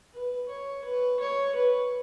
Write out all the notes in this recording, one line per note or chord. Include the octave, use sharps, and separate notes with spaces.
B4
C#5
B4
C#5
B4